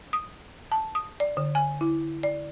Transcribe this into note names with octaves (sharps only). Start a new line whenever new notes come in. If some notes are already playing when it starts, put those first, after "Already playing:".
D#6
A5
D#6
D5
D3
G#5
E4
D5